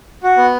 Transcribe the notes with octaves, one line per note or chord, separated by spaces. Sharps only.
F#4
B3